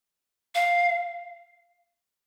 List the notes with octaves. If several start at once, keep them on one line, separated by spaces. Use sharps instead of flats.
F5